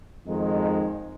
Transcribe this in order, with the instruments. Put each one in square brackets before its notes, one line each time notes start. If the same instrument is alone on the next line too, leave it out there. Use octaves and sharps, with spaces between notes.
[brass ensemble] F2 D#3 G#3 D#4